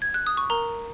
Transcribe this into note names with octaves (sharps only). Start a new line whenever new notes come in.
G#6
F#6
D#6
C#6
A#4 A#5